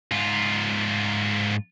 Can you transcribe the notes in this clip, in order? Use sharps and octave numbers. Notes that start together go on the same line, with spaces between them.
G#2 F4